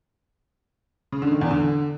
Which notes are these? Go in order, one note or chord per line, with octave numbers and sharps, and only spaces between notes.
C#3
D3
D#3
E2
D3